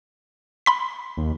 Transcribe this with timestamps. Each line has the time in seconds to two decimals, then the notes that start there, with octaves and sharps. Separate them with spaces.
0.66 B5 C6 B6
1.17 D#2